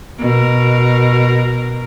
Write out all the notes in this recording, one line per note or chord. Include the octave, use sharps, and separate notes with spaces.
B2 A#4